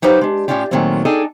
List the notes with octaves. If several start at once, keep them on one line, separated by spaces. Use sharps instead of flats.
F#3 D#4 G4 B4 C5 F5
G#3 D4
A2 G3 C#4 D4 F4 G4
A#2 D#3 F#3 A3 A#3 C4
D4 D#4 G#4 A4 G5 G#5